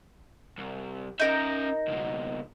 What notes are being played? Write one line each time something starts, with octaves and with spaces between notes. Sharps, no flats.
C2
C#4 D#4 A#4 E5 G6
C#2 B2